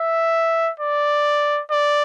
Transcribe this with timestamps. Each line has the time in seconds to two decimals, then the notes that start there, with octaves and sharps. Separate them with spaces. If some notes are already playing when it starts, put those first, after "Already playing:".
Already playing: E5
0.80 D5
1.71 D5